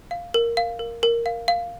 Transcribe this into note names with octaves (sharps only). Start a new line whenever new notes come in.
F5
A#4
F5
A#4
A#4
F5
F5